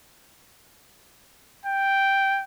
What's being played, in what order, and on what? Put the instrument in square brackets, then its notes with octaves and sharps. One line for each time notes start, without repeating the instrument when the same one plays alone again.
[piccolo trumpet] G5